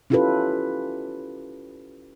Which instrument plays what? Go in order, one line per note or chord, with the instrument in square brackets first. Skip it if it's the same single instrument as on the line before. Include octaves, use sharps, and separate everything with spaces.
[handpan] C#4 E4 F4 G4 A4 B4